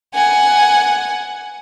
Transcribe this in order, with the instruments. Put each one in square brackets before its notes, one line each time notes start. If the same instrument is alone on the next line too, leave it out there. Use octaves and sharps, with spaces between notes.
[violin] F#5 G#5